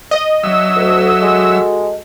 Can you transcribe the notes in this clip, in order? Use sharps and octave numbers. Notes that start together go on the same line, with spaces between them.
D#5
F#3 D4 E5 E6
D2 F#4 A4
G#3